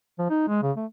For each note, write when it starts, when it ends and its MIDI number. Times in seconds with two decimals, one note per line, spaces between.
0.19 0.26 53
0.30 0.46 63
0.48 0.60 56
0.63 0.72 49
0.76 0.86 57